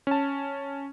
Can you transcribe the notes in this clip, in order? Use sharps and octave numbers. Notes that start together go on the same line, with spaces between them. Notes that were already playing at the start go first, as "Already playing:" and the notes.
C#4 A5